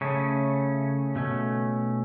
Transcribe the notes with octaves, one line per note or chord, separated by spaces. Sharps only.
C#3 A3 C#4
B2 A3 C#4